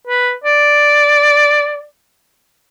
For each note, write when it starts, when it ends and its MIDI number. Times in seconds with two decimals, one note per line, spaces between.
0.07 0.32 71
0.44 1.84 74